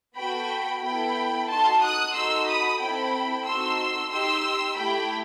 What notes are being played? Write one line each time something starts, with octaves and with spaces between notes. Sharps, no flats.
B3 F#4 A4 G5 B5
B3 E4 A4 G5 B5
D#4 F#4 A4 A5 C6
D#6 F#6
D#4 F#4 A4 C6 E6
B5 D#6
C4 E4 A4 G5 B5
C4 D#4 F#4 A4 C6 E6
D#4 G4 C6 E6
A3 E4 G4 G5 B5